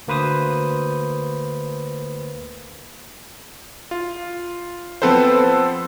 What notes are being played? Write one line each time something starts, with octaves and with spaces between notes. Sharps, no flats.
D2 A#3 B4 C5 D#6
F4
F3 B3 C4 A4 B4 C5